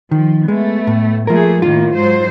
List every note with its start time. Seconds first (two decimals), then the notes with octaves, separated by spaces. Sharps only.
0.11 D#3 F3
0.48 G#3 A3 B3
0.87 A2
1.27 F3 A3 A#3 G#4 A#4
1.62 A2 D#3 A#3 F4
1.94 G#2 F#3 C5